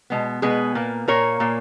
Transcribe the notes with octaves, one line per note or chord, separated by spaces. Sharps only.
B2 G#3 B3
B2 G#3 B3 G#4 B4
A#2 A#3
A#2 A#3 A#4 C#5
A#2 A#3